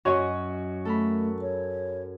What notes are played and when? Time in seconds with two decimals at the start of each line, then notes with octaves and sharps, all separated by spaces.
0.05 F#2 C#4 F#4 C#5 D#5
0.85 A3 A4 A#4 B5
1.42 C#5